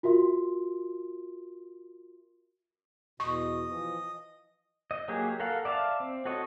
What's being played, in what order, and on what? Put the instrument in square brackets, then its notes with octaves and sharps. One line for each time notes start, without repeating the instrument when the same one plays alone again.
[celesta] F4 F#4 A#4 E5 C6
[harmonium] E2 B2 [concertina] D#5 [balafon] C#6
[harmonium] E3 F3
[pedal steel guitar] D#5
F#3 A#3 G4 G#4
A4 A#4 F5 F#5
D5 E5 F5 A5
C4
F#4 A4 C#5 D#5